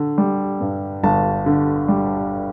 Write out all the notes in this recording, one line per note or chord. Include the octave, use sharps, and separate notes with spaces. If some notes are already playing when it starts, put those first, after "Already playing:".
Already playing: D3
G3
G2
G1 A5
D3
G3